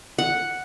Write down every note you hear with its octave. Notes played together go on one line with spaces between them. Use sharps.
F#5